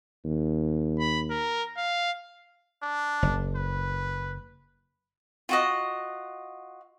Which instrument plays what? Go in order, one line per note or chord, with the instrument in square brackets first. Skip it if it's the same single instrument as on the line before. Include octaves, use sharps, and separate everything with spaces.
[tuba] D#2
[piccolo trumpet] B5
A#4
F5
[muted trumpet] D4
[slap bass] F#1
[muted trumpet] B4
[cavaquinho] F4 F#4 D#5